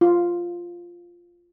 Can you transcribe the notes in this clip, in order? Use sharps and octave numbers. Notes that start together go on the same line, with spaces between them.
F4